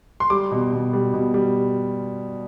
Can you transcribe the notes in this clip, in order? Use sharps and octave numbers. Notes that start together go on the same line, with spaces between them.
C6
G3 D6
B2
B2
G3
B2
G3